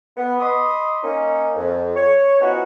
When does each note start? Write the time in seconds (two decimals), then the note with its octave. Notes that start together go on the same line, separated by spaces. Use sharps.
0.17 B3
0.40 D#5 B5 C6 D6 D#6
1.03 A#3 C#4 D#4
1.56 F2
1.96 C#5
2.40 F3 B3 C#4 D#4 E4 F#4